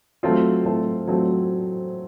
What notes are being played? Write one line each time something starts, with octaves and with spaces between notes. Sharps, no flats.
F#3 A3 C4 F4
F#3 A3 C4 F4
F#3 A3 C4 F4